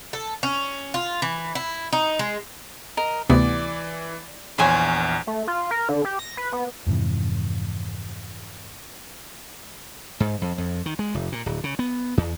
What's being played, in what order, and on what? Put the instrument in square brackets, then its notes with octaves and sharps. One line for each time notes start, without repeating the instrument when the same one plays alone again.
[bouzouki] A4
C#4
F4
E3
E4
D#4
G#3
[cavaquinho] A#4 [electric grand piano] D#5
[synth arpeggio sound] D2 C3 B3 [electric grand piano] E3 [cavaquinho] D5
[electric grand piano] A#1 E2 [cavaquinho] C5 C#5 G#5
[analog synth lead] A3
F4
A#4
D3
G4
A#6
B4
B3
[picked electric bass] F2 G#2 C3 E3
[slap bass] G#2
F2
F2
D#3
G#3
F1
A#2
D1
C#3
B3
E2